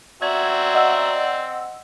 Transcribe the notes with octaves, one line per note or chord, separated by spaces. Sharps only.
C4 F#4 D5 E5 A#5 G#6
D#5 F#5 E6